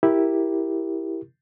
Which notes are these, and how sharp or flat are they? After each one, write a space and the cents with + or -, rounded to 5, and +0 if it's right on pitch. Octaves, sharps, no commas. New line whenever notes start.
E4 +0 G4 +0 A#4 +0